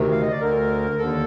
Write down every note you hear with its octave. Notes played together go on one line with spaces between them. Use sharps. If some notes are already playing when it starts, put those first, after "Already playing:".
Already playing: D2 C3 D#3
F5
D#5
D5
D2 D3 A#4
D#2 D3 A4